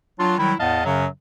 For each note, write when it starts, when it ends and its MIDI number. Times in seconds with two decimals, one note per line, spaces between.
0.19 0.37 54
0.19 0.37 62
0.19 0.37 65
0.38 0.54 51
0.38 0.54 54
0.38 0.54 55
0.38 0.54 64
0.59 0.81 40
0.59 0.81 45
0.59 0.81 59
0.59 0.81 75
0.59 0.81 77
0.59 0.81 81
0.85 1.06 42
0.85 1.06 49
0.85 1.06 54